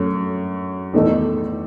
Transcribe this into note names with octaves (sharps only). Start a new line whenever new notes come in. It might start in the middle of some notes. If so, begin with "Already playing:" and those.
Already playing: F#2 A3 C#4
E2 D#3 A3 D#4 A4